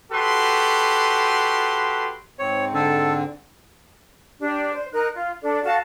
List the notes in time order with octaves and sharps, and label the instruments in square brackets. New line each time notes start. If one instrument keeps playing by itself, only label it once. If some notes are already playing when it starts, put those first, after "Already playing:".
[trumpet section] F#4 G4 A4 B4 C6
[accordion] G#2 C4 [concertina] C#5
[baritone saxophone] D3 [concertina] A4
[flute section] D4 G4
C5
D#4 A#4 F#6
F4
D4 A4 D5
F#4 A4 F5 A5